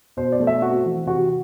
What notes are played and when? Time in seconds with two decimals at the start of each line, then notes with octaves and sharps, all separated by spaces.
0.17 B2 C5
0.32 D5
0.40 A3
0.47 E5
0.62 C4 F#4
0.85 E3
1.07 C3 F#4